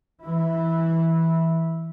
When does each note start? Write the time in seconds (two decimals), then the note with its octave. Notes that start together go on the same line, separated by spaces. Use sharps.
0.23 E3 E4